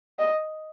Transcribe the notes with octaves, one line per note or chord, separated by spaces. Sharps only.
D#5